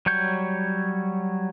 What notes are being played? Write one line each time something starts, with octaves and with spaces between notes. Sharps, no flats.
F#3 G3 C#5 G6